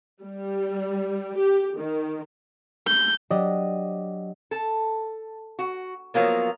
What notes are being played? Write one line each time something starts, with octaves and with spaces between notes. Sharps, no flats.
G3
G4
D#3
G6
F#3 D4 G4 D5 D#5
A4
F#4
F3 F#3 A#3 B3